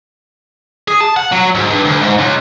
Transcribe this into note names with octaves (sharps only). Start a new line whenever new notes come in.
G#4
A5
F#5
F#3
G#2
G2
D2
G#2
C#2